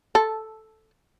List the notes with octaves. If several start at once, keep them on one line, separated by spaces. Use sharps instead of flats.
A4